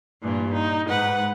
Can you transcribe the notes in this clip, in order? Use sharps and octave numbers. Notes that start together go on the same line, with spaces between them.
G2 A#2 E3
D#4
G#2 B4 F#5